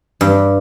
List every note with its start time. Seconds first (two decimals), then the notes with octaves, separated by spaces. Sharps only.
0.21 G2